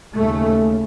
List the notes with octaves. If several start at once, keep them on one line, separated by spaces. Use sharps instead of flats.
D#2 C#3 A3